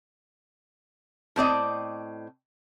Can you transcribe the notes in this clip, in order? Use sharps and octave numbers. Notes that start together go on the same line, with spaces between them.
A2 C4 D5 D#5